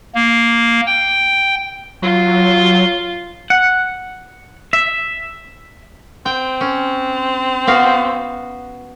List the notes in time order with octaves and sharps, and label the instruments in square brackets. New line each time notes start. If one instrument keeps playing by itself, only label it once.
[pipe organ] A#3
G5
[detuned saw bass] F#3 [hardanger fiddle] F4
[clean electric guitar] F#5
E5
[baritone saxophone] C4 [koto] G5
[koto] C#4
B3 F#4 F5